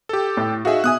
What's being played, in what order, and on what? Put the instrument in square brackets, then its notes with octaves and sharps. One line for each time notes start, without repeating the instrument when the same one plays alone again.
[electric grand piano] G4 A4
[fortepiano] A2
[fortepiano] D#4 G#4 F5 [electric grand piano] F#4 E5
[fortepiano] B2 E5 [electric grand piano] G#5 D#6 F#6